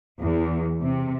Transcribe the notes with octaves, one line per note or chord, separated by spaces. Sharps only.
E2
C3